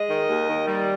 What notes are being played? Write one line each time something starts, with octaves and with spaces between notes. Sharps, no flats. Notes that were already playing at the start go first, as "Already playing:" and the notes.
Already playing: G#3 D#5
D#3
D#2
D#3
G3